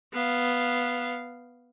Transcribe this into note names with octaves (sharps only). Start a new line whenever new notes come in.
B3 F5